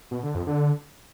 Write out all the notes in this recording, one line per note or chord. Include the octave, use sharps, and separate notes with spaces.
B2
D3
F2
D3